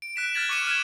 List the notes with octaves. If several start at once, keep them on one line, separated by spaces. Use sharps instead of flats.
D7
F#6 B6 E7
F6 F#6 G#6 A6 F#7
C#6 D6 C#7 D#7 E7
F6 G#6